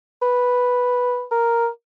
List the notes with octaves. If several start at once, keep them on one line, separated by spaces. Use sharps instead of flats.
B4
A#4